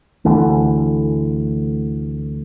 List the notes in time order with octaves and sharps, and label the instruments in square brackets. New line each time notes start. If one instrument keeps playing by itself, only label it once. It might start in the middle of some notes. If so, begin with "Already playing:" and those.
[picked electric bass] D2 D3 E3 A3